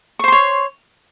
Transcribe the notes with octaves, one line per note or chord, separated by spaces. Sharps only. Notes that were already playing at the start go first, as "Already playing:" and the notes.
C5 C#5 C6 C#6